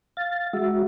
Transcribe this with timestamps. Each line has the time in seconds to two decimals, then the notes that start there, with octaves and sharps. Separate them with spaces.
0.17 F5 A6
0.53 G#3 F#4 E5